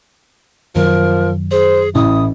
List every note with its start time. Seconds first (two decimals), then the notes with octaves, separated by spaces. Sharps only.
0.76 F#2 D#3 F3 F#3 A#4
1.52 G#4 C5
1.95 A1 E4 D#6